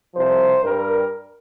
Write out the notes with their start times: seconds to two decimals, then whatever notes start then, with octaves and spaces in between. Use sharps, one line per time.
0.15 C2 C3 F3 C5
0.64 G2 G3 A#4